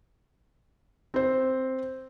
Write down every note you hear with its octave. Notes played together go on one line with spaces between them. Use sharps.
C4 C5